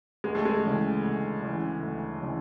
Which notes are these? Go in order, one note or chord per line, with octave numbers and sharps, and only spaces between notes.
D2 G#3
A3
G#3
C#3 E3
D2
C#3 E3
D2
C#3 E3